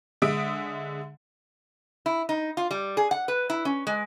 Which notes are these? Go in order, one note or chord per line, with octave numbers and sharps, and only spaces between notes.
D3 G#3 E5 D#6 D7
E4
D#4
F4
G3
G#4
F#5
B4
E4
C#4
G#3